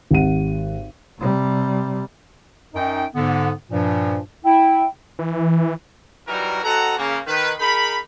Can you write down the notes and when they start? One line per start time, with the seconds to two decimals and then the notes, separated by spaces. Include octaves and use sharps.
0.11 G#1 G4 F#5 D#7
1.19 C3 G3
2.74 F#2 D#4 G5
3.14 G#2 D3 B3
3.70 G2 A#2 F3
4.45 E4 G5
5.19 E3
6.28 E3 F#3 G3 D#4 F#4 A#4
6.64 C4 F#4 A4 D#5 F#5 A#5
6.97 C#3 A#3
7.27 D#3 B4
7.59 D#4 G#4 A#4 B5